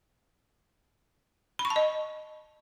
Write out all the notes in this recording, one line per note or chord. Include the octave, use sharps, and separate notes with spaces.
B5
C#6
A5
D#5